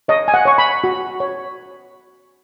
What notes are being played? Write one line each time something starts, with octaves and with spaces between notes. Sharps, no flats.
C#5 D#5
G#5
F#5
C#5 C#6
B5
F#4
C#5